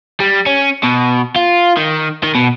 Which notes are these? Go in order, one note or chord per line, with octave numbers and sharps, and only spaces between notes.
G3
C#4
B2
F4
D#3
D#3
B2